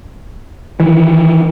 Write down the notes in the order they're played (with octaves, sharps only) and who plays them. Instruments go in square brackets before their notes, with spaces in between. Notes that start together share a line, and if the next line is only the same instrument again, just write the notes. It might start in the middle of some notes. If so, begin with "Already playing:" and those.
[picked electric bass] D#3 E3